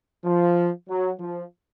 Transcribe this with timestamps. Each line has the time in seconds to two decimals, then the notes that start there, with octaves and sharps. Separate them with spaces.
0.24 F3
0.89 F#3
1.20 F3